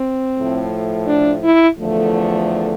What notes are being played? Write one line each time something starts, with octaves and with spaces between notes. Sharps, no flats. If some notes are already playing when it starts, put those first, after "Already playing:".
Already playing: C4
A2 F3 A3
D4
E4
E2 D3 F3 A3